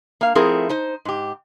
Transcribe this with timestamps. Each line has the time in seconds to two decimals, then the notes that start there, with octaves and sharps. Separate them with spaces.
0.21 A#3 F5
0.35 F3 A3 C4 E4 G#4 A#4
0.69 D#4 C5
1.05 G#2 G4